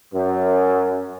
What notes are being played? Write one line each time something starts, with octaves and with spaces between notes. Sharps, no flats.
F#2